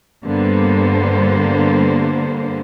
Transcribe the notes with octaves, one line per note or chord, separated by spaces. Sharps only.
G2 D3 G3 A#3 B3 C5